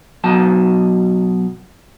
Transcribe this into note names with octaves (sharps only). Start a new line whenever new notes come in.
B2 F#3 A5